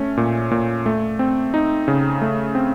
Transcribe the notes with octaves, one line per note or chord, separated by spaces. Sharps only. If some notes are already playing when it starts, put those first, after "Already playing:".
Already playing: A3 C#4
A#2
A#2
A3
C4
D#4
C#3
A3
C4